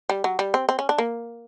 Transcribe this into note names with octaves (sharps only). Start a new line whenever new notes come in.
G3
F#3
G3
C4
C4
C#4
D4
A#3